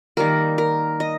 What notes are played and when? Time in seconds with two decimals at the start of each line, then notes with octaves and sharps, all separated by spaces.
0.17 D#3 G3 A#3 A#4
0.58 A#4
1.00 D#5